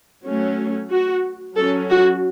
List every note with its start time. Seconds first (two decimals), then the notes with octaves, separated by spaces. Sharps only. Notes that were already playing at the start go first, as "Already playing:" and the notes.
0.26 F#3 A3 C#4
0.91 F#4
1.57 F#3 C#4 A4
1.89 F#4